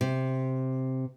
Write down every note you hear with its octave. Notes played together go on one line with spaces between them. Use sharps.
C3